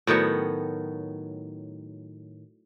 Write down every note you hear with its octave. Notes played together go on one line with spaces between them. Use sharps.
A2 D#3 F#3 B3